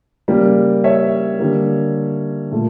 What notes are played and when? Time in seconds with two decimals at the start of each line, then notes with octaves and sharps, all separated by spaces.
0.28 C#3 G3 A#3
0.84 C#5 E5
1.39 D3 G3 A#3
2.51 A#2 A3